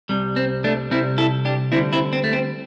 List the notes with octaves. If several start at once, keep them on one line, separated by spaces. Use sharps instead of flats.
C2 C3 G3
C4
A3 D4
C2 C3 G3 C4 E4
E4 A4
D4 G4
D2 D3 G3 C4 E4
C4 E4
C4
A3
C4